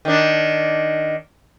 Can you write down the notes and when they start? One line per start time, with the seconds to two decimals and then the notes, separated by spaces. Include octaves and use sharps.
0.05 D#3 D4